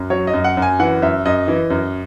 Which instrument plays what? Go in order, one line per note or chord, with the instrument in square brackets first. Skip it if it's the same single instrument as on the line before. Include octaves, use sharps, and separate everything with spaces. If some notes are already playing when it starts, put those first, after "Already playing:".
Already playing: [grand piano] F#2
F#3 C#5
D#5
F#2
F#5
F#2
G#5
E3 F#5
F#2 E5
F#2 D#5
E3
F#2